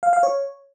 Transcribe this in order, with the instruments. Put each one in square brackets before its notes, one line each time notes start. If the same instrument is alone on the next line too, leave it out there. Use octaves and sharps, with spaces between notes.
[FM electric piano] F5
F5
C#5